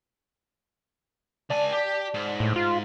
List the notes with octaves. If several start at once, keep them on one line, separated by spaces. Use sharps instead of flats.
C#2 D5 G#5 A5
G4
G#2
A2
F4